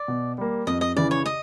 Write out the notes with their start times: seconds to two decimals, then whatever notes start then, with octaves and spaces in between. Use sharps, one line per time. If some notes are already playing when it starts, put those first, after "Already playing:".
Already playing: D5
0.08 B2
0.38 G3 A#3
0.67 F2 D#5
0.81 D#5
0.96 C#3 E3 D5
1.11 C#5
1.26 D#5